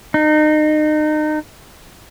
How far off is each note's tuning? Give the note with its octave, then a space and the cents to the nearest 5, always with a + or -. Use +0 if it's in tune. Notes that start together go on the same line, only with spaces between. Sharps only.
D#4 -30